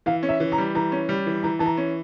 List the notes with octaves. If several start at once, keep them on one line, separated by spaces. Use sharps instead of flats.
E3 F5
C#4
E5
E3
A#5
G3
E3 A#5
C#4
G3
E3
E3 A#5
E3 A5
A#5
C#4